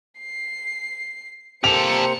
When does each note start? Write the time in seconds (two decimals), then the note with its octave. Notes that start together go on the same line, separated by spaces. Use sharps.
0.19 C7
1.64 C3 A#3 G4 A4 C5 C#7 F7